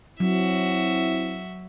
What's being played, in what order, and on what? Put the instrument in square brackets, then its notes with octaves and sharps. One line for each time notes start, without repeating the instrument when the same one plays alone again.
[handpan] F#3 [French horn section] C4 E4 [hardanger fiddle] F#4 E5